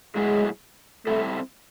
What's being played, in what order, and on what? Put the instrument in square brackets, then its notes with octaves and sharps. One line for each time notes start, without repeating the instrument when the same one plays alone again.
[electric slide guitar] A2 F#3 B3 E4 G#4 [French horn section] G#3
[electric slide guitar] G3 C4 E4 A4 [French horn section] A3